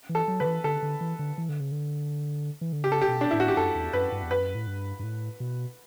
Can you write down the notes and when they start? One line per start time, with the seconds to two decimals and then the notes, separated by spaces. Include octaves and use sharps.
0.09 E3
0.15 A4
0.28 F#3
0.40 D3 B4
0.46 E3
0.64 D3 A4
0.83 D3
1.01 E3
1.19 D3
1.38 E3
1.49 D3
1.60 C#3
1.72 D3
2.61 E3
2.73 D3
2.84 C#3 G4
2.92 A4
3.01 G4
3.08 B2
3.21 D4
3.31 A2 E4
3.40 F#4
3.48 G4
3.57 F#2 A4
3.75 E2
3.93 F#2 B4
4.12 G2
4.23 E2
4.30 F#2 B4
4.55 A2
4.67 G2
4.99 G2
5.03 A2
5.40 B2